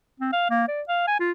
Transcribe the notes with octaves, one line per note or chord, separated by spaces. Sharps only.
C4
F5
A#3
D5
F5
G#5
F4